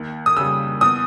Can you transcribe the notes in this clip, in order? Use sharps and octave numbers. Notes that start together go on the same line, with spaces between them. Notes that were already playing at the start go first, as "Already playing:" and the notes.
Already playing: D#2
D#6
C#3 G3 E6
E2 D#6